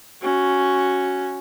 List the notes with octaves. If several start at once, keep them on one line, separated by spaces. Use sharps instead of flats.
C#4 F#4